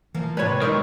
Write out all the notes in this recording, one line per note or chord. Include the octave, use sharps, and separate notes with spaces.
E3 F3 A#3
G#2 C3 G#3 B4 C#5 D5
D#3 F#3 D#4 A#4 C5 C#6 E6